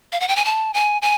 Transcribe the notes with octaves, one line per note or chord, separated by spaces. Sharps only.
F5
F#5
G5
G#5
A5
G#5
G#5